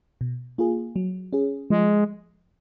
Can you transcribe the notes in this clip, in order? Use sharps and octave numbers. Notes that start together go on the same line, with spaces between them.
B2
A#3 F4 G#4
F#3
C#4 G#4
F3 G#3